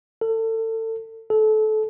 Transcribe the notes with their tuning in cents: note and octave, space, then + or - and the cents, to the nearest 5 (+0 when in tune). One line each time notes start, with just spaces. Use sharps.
A4 +30
A4 -25